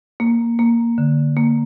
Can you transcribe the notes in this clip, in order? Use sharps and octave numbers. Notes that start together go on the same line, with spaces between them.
A#3
A#3
D3
A#3